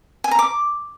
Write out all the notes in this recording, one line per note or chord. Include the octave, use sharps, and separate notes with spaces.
G#5
A#5
D6